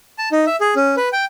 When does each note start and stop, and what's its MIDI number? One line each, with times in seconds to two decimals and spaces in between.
0.18 0.29 81
0.32 0.45 63
0.46 0.56 76
0.61 0.74 68
0.76 0.95 61
0.97 1.09 71
1.13 1.25 79